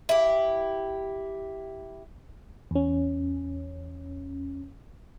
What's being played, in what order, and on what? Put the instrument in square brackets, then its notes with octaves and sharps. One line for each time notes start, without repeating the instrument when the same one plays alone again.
[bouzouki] E4 G4
[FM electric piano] E2 C#4